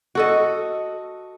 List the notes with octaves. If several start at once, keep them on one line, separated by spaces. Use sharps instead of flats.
F#4 A4 D#5